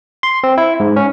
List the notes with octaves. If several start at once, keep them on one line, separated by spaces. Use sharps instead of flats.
C6
C4
E4
G#2
C#4